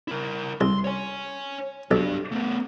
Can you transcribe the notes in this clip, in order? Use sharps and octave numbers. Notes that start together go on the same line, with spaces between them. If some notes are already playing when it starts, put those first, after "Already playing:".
E4 A#4
C2 C6
C#5 G#5
B1 D4 G4
A3 B3